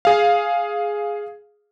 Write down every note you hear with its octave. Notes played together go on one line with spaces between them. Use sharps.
G#4 F5